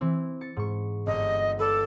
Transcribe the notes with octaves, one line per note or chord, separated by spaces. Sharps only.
E3 C4 E4
A6 C#7
G#2 C#6
G1 D#5
A4 B4 D5